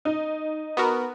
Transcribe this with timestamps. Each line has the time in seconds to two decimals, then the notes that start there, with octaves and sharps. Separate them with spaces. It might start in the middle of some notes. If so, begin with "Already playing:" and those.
0.05 D#4
0.77 B3 F#4 A#4